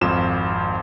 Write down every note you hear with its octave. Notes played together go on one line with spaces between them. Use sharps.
G#1 F2 F4 E7